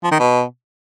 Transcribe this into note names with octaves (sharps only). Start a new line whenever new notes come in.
F3
D#3
B2